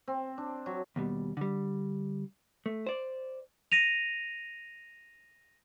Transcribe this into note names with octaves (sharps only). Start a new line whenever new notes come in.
C4
D4
F#3
D#2 B2 G3
D3 G3
A3
C5 D5
A#6 D#7 F7